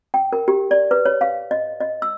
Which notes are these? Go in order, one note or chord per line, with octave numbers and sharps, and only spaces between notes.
G5
A#4
G4
D5
B4
C#5
F5
D#5
D#5
E6